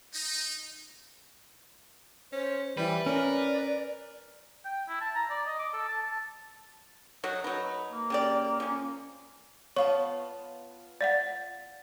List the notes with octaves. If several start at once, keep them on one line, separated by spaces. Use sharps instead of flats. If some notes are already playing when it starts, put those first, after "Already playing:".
D#4
C#4 C5
E3 G3 B4
C#4 A#4 D5
G5
E4
A5
A#5
D5
D#5
D6
A4
A5
A5
F#3 D#4 F#5
F#3 D#4 B4
A#3
C#3 G4 D5
F3 C#4
B3 F4 C#5 A5 C#6
D5 F5 F#5 A6